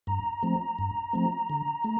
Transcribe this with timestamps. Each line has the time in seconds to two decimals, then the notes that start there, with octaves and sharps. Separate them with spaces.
0.07 G2 A#5
0.43 F3 A3 C4
0.79 G2
1.13 F3 A3 C4
1.50 D3
1.84 A3